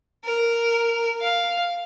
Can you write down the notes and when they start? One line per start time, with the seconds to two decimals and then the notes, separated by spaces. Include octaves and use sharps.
0.25 A#4
1.21 F5